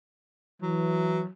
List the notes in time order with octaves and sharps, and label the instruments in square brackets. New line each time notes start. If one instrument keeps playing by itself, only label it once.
[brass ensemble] E3 [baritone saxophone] F#3